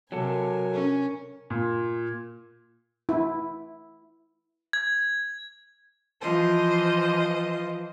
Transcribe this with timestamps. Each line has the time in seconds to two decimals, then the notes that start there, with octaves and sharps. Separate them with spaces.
0.12 C3 F#3 A4 A#4 G#5
0.73 C#4
1.50 A#2
3.09 E4
4.73 G#6
6.21 E3 F3 F4 C5 D#5